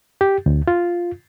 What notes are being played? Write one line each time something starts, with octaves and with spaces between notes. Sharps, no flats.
G4
D2
F4